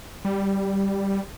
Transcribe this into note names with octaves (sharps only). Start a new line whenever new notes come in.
G3